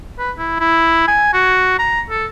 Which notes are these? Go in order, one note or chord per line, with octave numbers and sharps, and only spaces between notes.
B4
E4
E4
G#5
F#4
A#5
A4